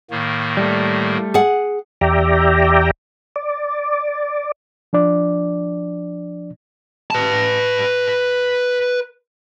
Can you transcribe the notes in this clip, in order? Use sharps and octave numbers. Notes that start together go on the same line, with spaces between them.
A2 D#3 A#3
G3 A3
G#4 F#5
E2 G4 D5 E5 G5 A#5
D5
F3 D4 D5
B4 A5